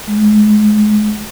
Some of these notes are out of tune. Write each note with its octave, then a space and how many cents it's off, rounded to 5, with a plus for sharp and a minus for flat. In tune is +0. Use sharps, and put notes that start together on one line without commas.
G#3 +30